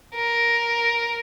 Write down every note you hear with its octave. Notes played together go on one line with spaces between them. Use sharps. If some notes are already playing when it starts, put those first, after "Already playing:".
A#4